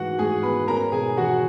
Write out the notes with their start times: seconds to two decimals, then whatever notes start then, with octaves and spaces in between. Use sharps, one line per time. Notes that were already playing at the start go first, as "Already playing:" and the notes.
Already playing: G#2 E3 F#4 F#5
0.18 G#2 G#4 G#5
0.43 B3 B4 B5
0.68 C#4 A#4 A#5
0.92 B2 G#4 G#5
1.17 E2 F#4 F#5